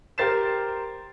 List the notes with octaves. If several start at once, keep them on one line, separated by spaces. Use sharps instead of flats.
G4 A#4 C5 A6 C7 E7